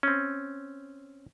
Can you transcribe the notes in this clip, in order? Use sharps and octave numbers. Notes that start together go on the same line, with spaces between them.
C4 C#4